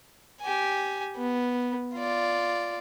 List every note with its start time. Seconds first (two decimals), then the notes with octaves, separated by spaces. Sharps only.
0.42 G4 G#5
1.17 B3
1.95 F4 D5